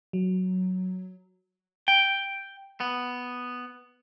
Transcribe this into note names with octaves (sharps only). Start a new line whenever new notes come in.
F#3
G5
B3